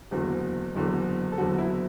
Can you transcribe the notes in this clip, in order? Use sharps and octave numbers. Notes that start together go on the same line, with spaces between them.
F#1 E2 D3 F#3
F#1 E2 D3 F#3
A4
F#1 E2 D3 F#3 F#4
E4